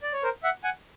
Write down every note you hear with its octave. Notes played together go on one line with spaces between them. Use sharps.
D5
C#5
A#4 C5
E5 F#5
F#5 G#5